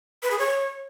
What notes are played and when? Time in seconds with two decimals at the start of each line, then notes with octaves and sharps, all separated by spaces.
0.23 B4
0.31 G#4
0.39 C#5